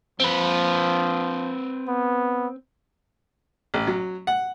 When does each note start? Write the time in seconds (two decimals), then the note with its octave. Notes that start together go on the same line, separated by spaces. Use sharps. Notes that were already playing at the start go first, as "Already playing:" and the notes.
0.20 F3 C4 B4
1.88 B3
3.74 A1
3.87 F#3
4.27 F#5